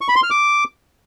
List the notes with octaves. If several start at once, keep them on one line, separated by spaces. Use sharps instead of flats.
C#6
B5
C6
F6
D6